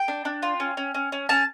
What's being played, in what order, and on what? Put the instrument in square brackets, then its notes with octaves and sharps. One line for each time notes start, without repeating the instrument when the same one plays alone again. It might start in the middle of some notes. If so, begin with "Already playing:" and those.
Already playing: [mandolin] G5
D4
D4
F4
C#4
C#4
C#4
C#4
C#4 A5